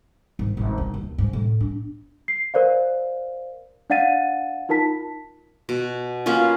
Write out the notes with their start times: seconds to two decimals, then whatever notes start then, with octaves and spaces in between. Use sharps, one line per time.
0.39 G#1
0.57 G#1
0.78 C#3
0.94 D#2
1.18 G#2
1.33 A2
1.61 D4
2.28 C7
2.54 A#4 C5 D5 F5
3.90 D4 D5 F5 F#5 A6 D#7
4.69 D#4 F4 A#4 A5 B6
5.69 B2
6.26 A#3 B3 C#4 F4